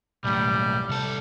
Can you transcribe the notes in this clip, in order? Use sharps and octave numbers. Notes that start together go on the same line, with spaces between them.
B1 A2 G3
C2 A4